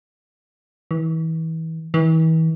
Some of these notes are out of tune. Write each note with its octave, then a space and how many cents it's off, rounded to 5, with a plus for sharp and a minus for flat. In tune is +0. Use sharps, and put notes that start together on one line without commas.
E3 -35
E3 -40